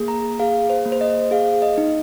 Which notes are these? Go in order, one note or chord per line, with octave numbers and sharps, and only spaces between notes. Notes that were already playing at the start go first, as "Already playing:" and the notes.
Already playing: A#3 G#4
A#5
G#4 F5
C5
A#3
C5
D#5
G#4 F5
D#5
D#4